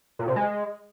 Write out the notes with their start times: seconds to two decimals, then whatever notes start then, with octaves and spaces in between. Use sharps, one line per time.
0.19 A#2
0.28 C3
0.36 G#3